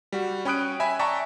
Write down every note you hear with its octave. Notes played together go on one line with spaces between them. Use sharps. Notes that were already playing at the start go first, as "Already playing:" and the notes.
G3 F#4
C#4 G5 B5 D#6 F#6 D7
E5 G#5 B5 G#6 B6
D5 E5 G5 A5 A#5 C#6